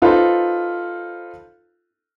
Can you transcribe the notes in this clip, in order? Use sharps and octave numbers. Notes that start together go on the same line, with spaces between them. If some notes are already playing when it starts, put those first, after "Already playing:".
D#4 F4 A4 B4 C5